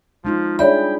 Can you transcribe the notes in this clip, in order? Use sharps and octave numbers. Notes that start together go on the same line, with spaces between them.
F3 G#3 D#4 F4
G3 D4 G#4 C#5 D5 E5 G5 B5